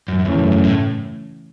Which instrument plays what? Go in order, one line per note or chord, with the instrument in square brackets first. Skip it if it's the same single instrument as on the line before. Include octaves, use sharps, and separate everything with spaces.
[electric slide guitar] F#2
F#2
[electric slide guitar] E2 [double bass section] C#3 E3 A3 C#4
[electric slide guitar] F#2
F#2
A2